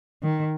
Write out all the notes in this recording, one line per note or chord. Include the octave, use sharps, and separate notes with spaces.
D#3